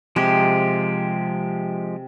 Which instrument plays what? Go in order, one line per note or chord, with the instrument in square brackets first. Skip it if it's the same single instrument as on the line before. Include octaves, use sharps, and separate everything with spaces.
[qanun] C3 [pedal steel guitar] F3 G#3 G4